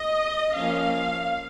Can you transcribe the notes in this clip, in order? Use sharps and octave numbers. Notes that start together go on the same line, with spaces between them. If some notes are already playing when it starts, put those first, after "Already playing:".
Already playing: D#5
F3 A#3 C#4 F5